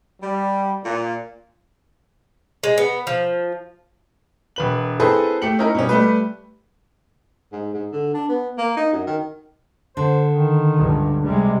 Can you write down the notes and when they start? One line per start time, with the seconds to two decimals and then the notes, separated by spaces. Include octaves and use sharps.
0.21 G3
0.84 A#2
2.64 G#3
2.78 B3
3.07 F3
4.56 E1 B4 F#7
5.00 C4 E4 G#4 A4 B4 C5
5.42 A3 G4 C#7 F#7
5.59 C#4 D#4 E4 A#4
5.74 B2 G3 C#4
5.89 G3 A3 B4
7.52 G#2
7.74 G#2
7.92 D3
8.14 D4
8.29 B3
8.58 A#3
8.77 D#4
8.93 F#2
9.07 D#3
9.97 D3 C5
10.32 D#3
10.77 C#2 G2
11.25 C3 G3 G#3